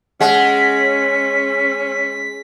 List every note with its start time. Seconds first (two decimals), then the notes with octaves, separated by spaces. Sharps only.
0.21 G#3 C#4 F#5 B6